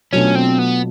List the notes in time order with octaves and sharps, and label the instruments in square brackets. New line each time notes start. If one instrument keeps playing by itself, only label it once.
[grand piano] B2 F#3 A3 D4 F4 [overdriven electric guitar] C#4
[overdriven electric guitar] C4
B3